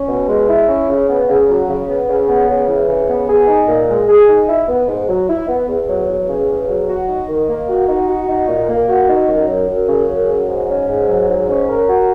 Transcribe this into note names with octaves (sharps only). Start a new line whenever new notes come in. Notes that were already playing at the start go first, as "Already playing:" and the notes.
Already playing: C#4
B2
G#3
E4
C#4
C#3
B3
C#3
F#3
C#3
B3
C#3
B3
C#3
E3
C#3
B3
G#4
D#4
A#2
G#3
G#4
D#4
E4
B3
G#2
F#3
E4
B3
E2
F#3
E2
C#3
E2
F#3
F#4
D#4
D#3
A#3
F#4
D#4
F#4
D#4
A#2
A#3
F#4
D#4
F#2
F#3
F#2
C#3
F#2
F#3
G#2
C#4
G#2
F#3
G#2
C#4
A#4
F#4